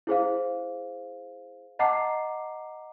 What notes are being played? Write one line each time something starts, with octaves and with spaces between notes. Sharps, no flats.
E4 G#4 C5 F5
D#5 F#5 A5 A#5 D6 C7